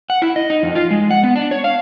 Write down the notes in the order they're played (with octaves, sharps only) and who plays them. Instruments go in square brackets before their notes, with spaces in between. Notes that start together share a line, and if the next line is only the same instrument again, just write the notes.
[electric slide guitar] F#5
E4
D#5
D#4
F2
F4
G#3
F#5
B3
D4
C#5
F5